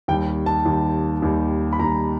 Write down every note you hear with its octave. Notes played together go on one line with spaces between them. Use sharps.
D#2 D#3 G3 G5
A5
D#2 D#3 G3
D#2 D#3 G3
B5
D#2 D#3 G3 A#5